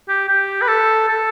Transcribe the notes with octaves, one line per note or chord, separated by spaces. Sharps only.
G4
G4
B4
A4
A4